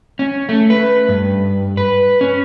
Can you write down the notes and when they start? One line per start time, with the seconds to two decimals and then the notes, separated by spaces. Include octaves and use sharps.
0.19 C#4
0.49 A3
0.70 B4
1.09 G2
1.77 B4
2.21 C#4